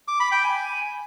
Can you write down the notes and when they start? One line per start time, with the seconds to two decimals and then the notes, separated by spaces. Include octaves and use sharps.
0.08 D6
0.20 B5
0.32 G5
0.44 G#5